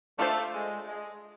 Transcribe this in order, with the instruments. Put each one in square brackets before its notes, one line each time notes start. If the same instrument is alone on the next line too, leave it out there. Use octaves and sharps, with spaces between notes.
[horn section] A3 [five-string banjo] D4 F4 A4 C5
[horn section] G#3
G#3